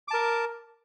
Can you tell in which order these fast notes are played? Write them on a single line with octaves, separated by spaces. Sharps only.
D6 A5 A#4